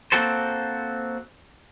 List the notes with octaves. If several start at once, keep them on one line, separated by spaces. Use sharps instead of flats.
A#3 C4 F#4 A4 C5